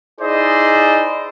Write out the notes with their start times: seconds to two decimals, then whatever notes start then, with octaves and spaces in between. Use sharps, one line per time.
0.21 D#4 E4 G#4 C5 D5 D#5